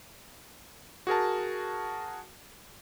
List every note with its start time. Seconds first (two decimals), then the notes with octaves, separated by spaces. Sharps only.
1.07 F#4 G#4 A#4 A5